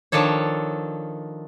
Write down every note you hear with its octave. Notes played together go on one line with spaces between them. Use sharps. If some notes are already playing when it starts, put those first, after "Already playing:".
D#3 F3 D4 A4 C#5